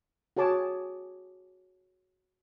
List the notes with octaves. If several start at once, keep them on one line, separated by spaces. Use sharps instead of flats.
F#4 G#4 C#5 A5 D6